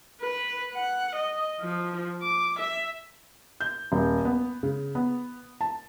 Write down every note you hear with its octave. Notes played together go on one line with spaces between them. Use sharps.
B4
F#5
D#5
F3
D6
E5
G6
D#1
B3
C#3
B3
A5